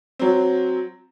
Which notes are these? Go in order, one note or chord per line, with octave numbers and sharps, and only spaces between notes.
F#3 C4